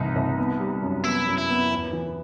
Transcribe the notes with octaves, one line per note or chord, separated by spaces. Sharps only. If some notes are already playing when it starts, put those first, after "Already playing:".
Already playing: C2 C3 E3 D#4
C2
B3
G3
F#2
B3 E4
F#2
E4
B3
E2
E3